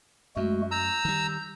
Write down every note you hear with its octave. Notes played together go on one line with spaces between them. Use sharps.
F#2 G#3 A3 F#4
A#5 E6 G6
D#3 G3